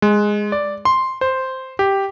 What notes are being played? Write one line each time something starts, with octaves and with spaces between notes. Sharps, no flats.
G#3
D5
C6
C5
G4